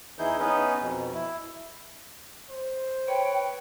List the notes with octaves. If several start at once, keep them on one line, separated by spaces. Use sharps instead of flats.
E2 E3 D#4 E4 G#4 G6
B3 C#4 D#4 B4
F2 B2
E4
C5
B4 C#5 G5